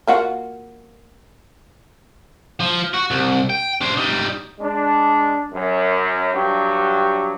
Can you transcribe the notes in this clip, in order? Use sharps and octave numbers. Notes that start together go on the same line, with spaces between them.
A#3 F4 F#4
F3
F#4
C2
G5
D4 C5
G3 D#4
G#3 D4
F#2
G2 F#3 G4